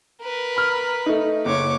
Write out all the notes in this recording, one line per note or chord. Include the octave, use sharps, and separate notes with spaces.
A#4 B4
B5 F6
A3 D#4
F#1 C#5 D6